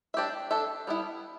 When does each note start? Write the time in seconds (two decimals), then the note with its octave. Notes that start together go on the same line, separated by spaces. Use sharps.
0.14 D4 G4 E5
0.51 D4 A4 E5
0.87 G3 B3 E4